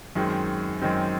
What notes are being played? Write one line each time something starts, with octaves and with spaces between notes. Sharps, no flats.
F#2 D#3 G#3 C4
F#2 D#3 G#3 C4